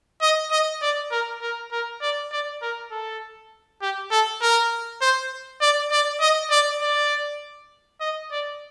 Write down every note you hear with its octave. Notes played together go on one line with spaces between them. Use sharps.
D#5
D#5
D5
A#4
A#4
A#4
D5
D5
A#4
A4
G4
A4
A#4
C5
D5
D5
D#5
D5
D5
D#5
D5